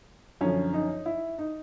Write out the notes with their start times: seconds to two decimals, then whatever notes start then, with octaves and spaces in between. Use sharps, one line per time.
0.41 F#2 D3 F3 C#4
0.73 D#4
1.06 E4
1.38 D#4